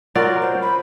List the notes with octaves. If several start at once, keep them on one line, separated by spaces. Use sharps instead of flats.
F#3 F4 A#4 D5
C5
B5